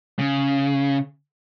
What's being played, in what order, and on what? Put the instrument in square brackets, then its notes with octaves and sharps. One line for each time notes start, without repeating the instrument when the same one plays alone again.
[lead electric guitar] C#3